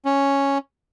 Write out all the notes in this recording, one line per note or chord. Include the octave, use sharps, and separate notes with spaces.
C#4